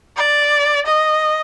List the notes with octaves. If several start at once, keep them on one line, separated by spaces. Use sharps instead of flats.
D5
D#5